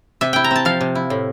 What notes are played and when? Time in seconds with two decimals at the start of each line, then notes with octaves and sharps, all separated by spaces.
0.21 C3 E5
0.33 E4 G5
0.44 A#5
0.51 C4 A5
0.65 F3 F5
0.81 C3
0.95 E4
1.10 A2